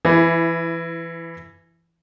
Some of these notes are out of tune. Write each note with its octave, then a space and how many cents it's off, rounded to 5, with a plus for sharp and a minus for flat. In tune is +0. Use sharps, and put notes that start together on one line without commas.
E3 +20 E4 +0